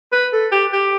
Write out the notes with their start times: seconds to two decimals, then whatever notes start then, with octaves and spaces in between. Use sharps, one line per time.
0.12 B4
0.32 A4
0.52 G4
0.72 G4